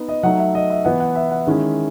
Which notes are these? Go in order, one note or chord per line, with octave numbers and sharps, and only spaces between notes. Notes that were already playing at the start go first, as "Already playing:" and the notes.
Already playing: B3 D#4
D#5
F#3 A3 D#4 F#5
E5
D#5
E5
E3 B3 E4 F#5
F#5
E5
F#5
D#3 G#3 C#4 E4